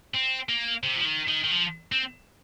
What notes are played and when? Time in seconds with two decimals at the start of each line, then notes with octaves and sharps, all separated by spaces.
0.15 C4
0.49 A#3
0.83 C3
0.96 F3
1.05 D#3
1.28 D#3
1.44 D#3
1.51 F3
1.92 C4